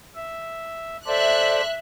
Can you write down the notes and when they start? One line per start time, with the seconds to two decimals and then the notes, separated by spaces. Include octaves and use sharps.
0.15 E5
1.06 A4 C5 D5 E5 F#6